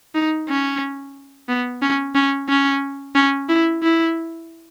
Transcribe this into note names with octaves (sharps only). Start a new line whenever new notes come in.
D#4
C#4
B3
C#4
C#4
C#4
C#4
E4
E4